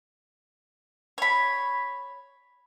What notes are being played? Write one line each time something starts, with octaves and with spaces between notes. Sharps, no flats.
C#5 B5